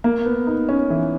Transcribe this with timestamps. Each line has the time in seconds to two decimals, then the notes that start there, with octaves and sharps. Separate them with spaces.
0.04 A#3
0.26 B3
0.47 D#4
0.69 C#4
0.90 E3